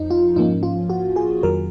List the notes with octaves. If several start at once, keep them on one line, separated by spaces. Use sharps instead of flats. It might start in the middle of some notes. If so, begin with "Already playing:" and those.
Already playing: F2 F3 D#4
F4
G#2 F3 A#3 C#4 D#4
F4
F#4
G#4
F2 D#3 F#3 A#4